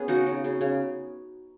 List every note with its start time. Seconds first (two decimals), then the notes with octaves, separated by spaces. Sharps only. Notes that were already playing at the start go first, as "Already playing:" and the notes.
Already playing: B3 C#4 G#4
0.08 C#3 D#4 F#4
0.26 C#3
0.44 C#3
0.61 C#3